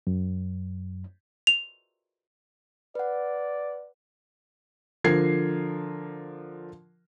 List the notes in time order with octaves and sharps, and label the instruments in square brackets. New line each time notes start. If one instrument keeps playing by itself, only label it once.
[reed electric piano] F#2
[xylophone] F7
[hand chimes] B4 F#5 [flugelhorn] D5
[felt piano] D3 F3 A#4 G#6 C7